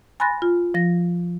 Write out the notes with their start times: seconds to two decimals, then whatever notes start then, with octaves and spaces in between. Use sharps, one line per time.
0.20 G#5 B5 C6 F#6 A6 A#6
0.42 F4
0.74 F3 A#6